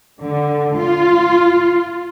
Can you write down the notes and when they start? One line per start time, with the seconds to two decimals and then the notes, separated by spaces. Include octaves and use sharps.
0.20 D3
0.78 F4